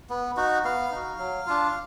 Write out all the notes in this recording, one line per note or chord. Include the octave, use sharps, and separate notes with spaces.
B3
D#4 F#4
B3 F5
D#4 F#4
F#3
D4 F4